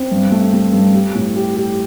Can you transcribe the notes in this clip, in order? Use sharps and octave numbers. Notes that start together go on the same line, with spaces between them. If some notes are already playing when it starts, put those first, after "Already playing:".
Already playing: C4
G2
A3
A3
G2
G4
A2
G4
G4